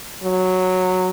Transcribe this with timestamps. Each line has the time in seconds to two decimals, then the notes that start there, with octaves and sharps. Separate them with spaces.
0.24 F#3